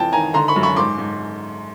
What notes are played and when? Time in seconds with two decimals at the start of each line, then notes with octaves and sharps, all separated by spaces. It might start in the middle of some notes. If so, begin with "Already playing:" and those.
Already playing: F2 E3 G5 A5
0.13 D#3 G#5 A#5
0.34 D3 A#5 C6
0.48 B5 C#6
0.56 F#2
0.63 B5 C#6
0.76 G#2 C6 D6
0.98 G#2